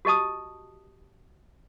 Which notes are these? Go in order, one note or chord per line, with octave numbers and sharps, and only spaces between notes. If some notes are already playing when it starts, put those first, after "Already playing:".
F#4 G4 D#5 A5 D#6